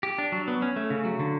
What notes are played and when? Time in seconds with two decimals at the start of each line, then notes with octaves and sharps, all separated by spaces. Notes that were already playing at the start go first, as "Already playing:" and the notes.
0.03 G4
0.18 D4
0.32 F#3
0.48 B3
0.62 C#4
0.76 A3
0.90 C#3
1.05 F#3
1.20 D3